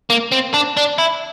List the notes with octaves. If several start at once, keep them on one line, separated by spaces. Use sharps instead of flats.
A#3
C4
D4
D4
E4